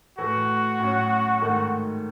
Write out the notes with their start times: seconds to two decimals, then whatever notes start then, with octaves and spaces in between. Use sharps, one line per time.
0.18 A2 E3 A3 E4 F#4
0.80 A2 F#3 C#4
1.41 G#2 D#3 A3